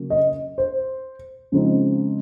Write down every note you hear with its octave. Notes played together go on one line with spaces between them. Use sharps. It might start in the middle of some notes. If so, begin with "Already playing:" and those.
Already playing: C#3 F#3 A#3 C#4
D#5
C5
C#3 F3 G#3 C4 D#4